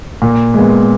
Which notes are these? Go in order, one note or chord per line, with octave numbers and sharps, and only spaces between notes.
A#2
G#3 B3